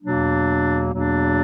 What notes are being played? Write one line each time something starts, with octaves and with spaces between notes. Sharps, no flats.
E2 B2 F#3 A#3 D4
E2 B2 F#3 A#3 D4